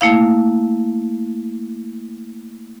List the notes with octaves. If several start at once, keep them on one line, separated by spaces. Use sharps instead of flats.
A3 A#3 E4 F5